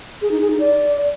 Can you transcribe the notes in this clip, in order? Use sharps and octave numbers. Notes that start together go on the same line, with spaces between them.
G#4
D#4
G#4
D#4
D5